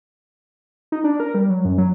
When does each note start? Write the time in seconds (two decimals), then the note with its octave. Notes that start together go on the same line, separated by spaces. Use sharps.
0.92 D#4
1.04 D4
1.20 A#4
1.34 G3
1.50 F#3
1.65 F#2
1.78 F#3